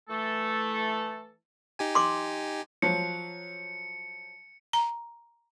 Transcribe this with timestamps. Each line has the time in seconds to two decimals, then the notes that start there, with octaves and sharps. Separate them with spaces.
0.09 E3 A3 A4
1.79 D#4 G4 G#5
1.95 C6 D6
2.82 F3 F#3 C#7
4.73 A#5